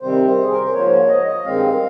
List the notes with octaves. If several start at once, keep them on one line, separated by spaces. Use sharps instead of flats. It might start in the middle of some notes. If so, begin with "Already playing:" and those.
C3 D#3 G3 C4 C5
G#4
A#4
C5
G#2 F3 A#3 C#5
D#5
D#5
G2 D#3 G#3 C4 F5